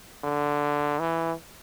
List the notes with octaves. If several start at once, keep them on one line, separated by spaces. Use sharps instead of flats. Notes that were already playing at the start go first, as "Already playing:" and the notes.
D3
E3